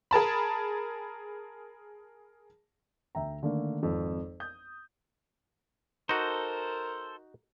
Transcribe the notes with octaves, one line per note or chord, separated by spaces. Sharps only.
G#4 A#4 A5 B5
D2 E5 G5 A#5
D3 D#3 A3 A#3
G#1 F2
D#6 G6
D#4 F#4 A4 A#4 C5